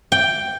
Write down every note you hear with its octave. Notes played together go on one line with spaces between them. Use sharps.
G5